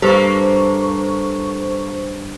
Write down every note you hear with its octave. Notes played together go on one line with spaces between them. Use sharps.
G2 A#3 A4 C5 C#6